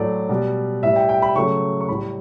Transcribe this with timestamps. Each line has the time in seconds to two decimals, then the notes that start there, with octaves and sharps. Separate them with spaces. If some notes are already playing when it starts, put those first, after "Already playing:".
Already playing: A2 F#3 A3 D5
0.29 B2 G3
0.83 A2 G3 E5
0.96 G5
1.09 G5
1.22 B5
1.35 C#3 F#3 A3 C#6
1.80 C#6
1.88 A2 G3 B5